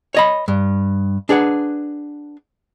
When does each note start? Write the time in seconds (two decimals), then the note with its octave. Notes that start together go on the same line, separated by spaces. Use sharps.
0.15 C#5 D#5 B5
0.48 G2
1.29 D4 G#4 B4 F#5